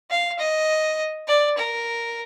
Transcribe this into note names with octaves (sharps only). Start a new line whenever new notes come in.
F5
D#5
D5
A#4